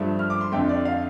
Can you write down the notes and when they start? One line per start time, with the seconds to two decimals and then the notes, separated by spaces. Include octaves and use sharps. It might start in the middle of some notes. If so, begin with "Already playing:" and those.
Already playing: G2 F3 A3
0.19 F6
0.30 D6
0.41 C6
0.52 F2 D3 A3 G5
0.69 D5
0.85 F5